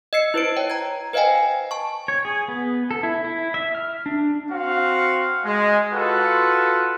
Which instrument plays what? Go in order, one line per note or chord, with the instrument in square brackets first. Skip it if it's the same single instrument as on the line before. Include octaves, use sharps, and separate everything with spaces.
[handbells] D#5 E6 C7 C#7
E4 B4 C5 D7
C#5 G5
A#5 G#6
B4 C5 D#5 F5 G5 G#5
A5 C#6
[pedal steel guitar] C#5
G#4
B3
A4
E4
E4
E5
F6
D4
[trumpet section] C4 F#4 F5
G#3
F4 F#4 A4 B4